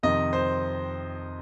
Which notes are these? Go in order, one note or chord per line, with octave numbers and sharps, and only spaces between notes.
F2 C3 D#3 D#5
C5